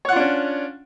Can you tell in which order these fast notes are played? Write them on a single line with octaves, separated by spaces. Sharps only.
C#5 F#5 F4 D4 C#4